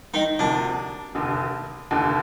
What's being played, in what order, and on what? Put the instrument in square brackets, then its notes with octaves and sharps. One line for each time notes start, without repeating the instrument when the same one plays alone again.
[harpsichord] D#3 D#4
[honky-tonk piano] D2 C3 F3 A#3 [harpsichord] D4
[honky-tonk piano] F1 D#2 D3
F1 D#2 D3